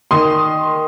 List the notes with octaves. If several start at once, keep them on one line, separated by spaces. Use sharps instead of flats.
D#3 C6 D#6